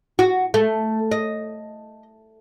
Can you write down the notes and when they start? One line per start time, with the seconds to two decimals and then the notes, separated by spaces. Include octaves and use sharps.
0.19 F#4
0.54 A3
1.11 D#5